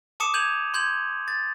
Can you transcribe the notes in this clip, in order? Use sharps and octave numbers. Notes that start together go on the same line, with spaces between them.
A5 D6 D#6 C#7 E7
G6 G#6 D#7 F7 F#7
C6 G6 G#6 F#7
A6